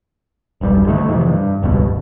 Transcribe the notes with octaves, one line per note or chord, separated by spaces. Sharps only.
E1 B1 G2 G3
D3 D#3 F3 A3
F2 C3 D#3 E3
G2
E1 C#2 G2 B2
F1